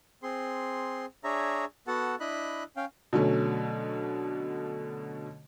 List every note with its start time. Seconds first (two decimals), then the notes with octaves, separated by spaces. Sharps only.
0.23 C4 G#4 C6
1.24 D4 G#4 C#5 E5 A#5
1.87 B3 F#4 A4 F#5 A5
2.20 D4 E4 D#5 B5 F#6
2.77 C#4 F5 G5
3.13 B2 D3 F#3 A3 C#4